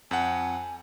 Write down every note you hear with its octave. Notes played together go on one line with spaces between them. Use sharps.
F2 F#5 G#5